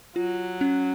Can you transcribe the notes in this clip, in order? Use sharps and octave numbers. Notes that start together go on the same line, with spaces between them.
F#3 F4
C#4